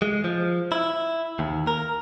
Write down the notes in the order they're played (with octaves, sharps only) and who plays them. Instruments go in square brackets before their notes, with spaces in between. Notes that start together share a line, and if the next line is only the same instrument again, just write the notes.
[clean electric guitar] G#3
F3
E4
D#2
A#4